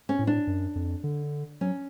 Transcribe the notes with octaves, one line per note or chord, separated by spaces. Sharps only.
C#4
A2
D4
F#2
F2
D3
F#3 C#4